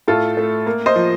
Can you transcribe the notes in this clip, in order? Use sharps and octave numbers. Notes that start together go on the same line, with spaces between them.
A2 F4 A4
A3
A#3
C5 D#5
F3